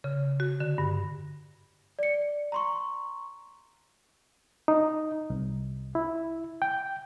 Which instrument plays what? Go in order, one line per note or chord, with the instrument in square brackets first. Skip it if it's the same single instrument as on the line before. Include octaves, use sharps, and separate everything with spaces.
[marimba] C#3
F#4
D3
G2
[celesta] D5 C#7
A#5 C6 C#6
[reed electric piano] D#4
C2
E4
G5